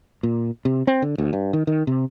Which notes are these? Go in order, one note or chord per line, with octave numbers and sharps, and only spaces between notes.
A#2
C3
C4
D3
D2
G2
D#3
D#3
C3